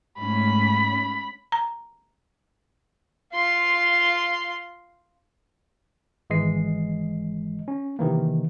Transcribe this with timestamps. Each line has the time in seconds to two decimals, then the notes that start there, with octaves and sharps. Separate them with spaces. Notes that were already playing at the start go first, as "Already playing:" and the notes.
0.20 G#2 A3 C#4 B5
1.52 A#5
3.34 F4 C6
6.30 G#1 E3 G#3 D#5 C7
7.68 C#4
7.99 C3 D#3 E3 A#3